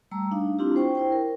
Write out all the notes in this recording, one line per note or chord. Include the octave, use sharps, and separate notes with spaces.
G3 A3 A#5 E6
D4 D#4 F5
C4 D4 E4 F4 G4
C5 G5 C#6
E4 C5 G5
A#4